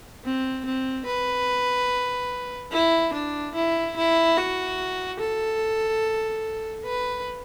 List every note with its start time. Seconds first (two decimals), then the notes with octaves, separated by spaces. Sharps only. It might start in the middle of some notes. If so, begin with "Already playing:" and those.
0.25 C4
0.65 C4
1.06 B4
2.72 E4
3.13 D4
3.55 E4
3.96 E4
4.37 F#4
5.20 A4
6.85 B4